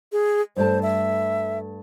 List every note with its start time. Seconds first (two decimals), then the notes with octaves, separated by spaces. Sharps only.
0.12 G#4
0.57 G2 A3 C5 A5
0.82 E5